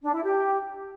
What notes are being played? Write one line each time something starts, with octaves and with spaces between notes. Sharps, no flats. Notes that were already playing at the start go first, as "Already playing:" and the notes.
D4
E4
G4